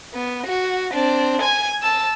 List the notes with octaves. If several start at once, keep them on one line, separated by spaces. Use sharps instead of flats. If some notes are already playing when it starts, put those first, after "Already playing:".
B3
F#4
C4 D4
G#5 G#6
A5 E6